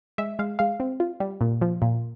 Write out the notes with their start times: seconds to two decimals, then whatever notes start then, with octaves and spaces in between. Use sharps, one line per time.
0.18 G#3 E5
0.39 G#3 F5
0.59 G#3 F5
0.80 C4
1.00 F4
1.20 G3
1.41 A#2
1.61 F3
1.82 A#2